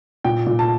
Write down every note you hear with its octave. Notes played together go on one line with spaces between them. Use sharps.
A#2 G5
A#2
A5